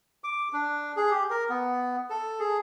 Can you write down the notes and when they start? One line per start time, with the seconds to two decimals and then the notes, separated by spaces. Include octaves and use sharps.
0.24 D6
0.53 D4
0.97 G#4
1.11 G4
1.30 A#4
1.50 B3
2.10 A4
2.39 G#4